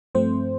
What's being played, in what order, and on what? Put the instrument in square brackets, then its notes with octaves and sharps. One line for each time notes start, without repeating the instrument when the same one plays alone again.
[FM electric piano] G2 F3 A3 C4 C5